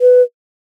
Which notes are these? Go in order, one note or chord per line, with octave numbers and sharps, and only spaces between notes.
B4